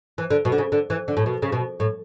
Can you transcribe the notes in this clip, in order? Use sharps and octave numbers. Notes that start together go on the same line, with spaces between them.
E3
D3
B2
D3
C#3
D3
E3
D3
A2
B2
C#3
B2
A2